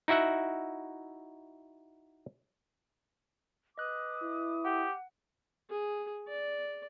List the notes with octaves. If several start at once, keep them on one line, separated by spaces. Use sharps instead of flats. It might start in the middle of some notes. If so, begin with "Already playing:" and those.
D#4 E4 F#4 E5 F#5
B4 D#5 D6 D#6 F#6
E4
G4 F#5
G#4
D5